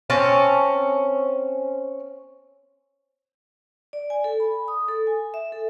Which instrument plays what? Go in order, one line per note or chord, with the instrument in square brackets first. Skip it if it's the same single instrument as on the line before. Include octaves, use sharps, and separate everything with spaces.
[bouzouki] C4 C#4 A5
[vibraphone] D5
G#5
A4
B5
D#6
A4
G#5
E5
A4